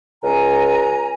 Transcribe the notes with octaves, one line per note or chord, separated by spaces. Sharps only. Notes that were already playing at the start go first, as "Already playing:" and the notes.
C#2 G#5 A#5